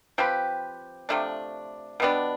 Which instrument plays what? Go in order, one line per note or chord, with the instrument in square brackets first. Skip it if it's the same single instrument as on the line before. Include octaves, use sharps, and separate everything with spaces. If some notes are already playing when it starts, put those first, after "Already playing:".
[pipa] F3 C4 G4 B4
C3 F3 A3 D4
B2 G3 B3 D4